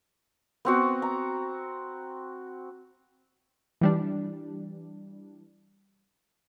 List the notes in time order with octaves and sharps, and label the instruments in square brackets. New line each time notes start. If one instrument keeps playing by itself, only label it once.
[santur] B3 C4 F#4
A#5
[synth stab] E3 G3 D4